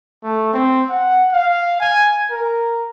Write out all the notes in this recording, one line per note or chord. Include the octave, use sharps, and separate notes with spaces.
A3
C4
F#5
F5
G#5
A#4